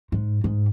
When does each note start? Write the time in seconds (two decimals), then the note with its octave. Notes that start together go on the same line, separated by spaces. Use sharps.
0.12 G#2
0.44 G#2